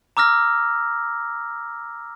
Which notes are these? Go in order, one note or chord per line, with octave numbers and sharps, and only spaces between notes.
A#5 D6 E6 F6 A#6